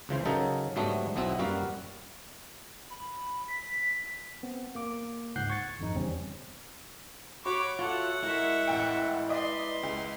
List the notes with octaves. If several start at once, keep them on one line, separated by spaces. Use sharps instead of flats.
C#2 C#3 E3 C5
C#3 F#3 D#4 A4 A#4
G#2 F#3 G3 A3 B3 D4
B1 B2 B3 C4 E4
F#2 G3 A#3 F#4 B4 F5
B5
B6
B3 C4
A#3 D6
C#2 G#2 F#5 F#6 G6 C7
C#6 G#6 A6 C#7
G#1 F2 D#4
E2 C#3 G3 C4 C#4
F#4 C#5 B5 D6
F4 A4 C#5 E5 F#5
G#3 E4 A#4 E5 C#6
A1 G5
B4 D5 D#5 C6
C#2